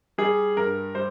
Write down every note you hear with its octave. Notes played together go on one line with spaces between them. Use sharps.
G3 G#4
G2 A#4
G3 C5